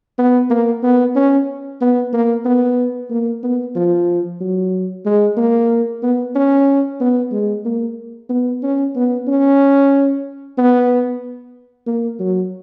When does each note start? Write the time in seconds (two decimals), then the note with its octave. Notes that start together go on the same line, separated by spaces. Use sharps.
0.18 B3
0.50 A#3
0.83 B3
1.15 C#4
1.81 B3
2.13 A#3
2.45 B3
3.10 A#3
3.43 B3
3.76 F3
4.41 F#3
5.06 G#3
5.37 A#3
6.03 B3
6.35 C#4
7.00 B3
7.32 G#3
7.65 A#3
8.29 B3
8.62 C#4
8.95 B3
9.28 C#4
10.58 B3
11.87 A#3
12.19 F#3